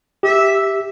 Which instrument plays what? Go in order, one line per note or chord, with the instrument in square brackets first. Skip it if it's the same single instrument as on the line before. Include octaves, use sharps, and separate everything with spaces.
[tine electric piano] G4 [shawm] E5